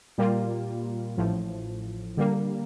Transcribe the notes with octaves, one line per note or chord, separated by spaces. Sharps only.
A#2 G3 A#3 F4
A1 A2 F3
D3 G3 A#3